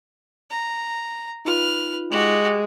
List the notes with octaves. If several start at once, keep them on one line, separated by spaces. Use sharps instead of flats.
A#5
D#4 F4 B4 F6
G#3 F#4 G4